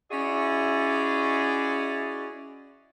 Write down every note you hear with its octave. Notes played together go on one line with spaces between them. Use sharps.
C#4 E4 F#4 G#4 D5 D#5